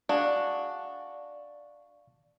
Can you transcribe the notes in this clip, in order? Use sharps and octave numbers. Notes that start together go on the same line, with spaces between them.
D4 F#4 G#4 D5 F5 C#6